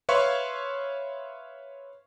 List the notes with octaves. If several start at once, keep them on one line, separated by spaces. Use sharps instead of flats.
B4 C#5 E5 F5 C6 C#6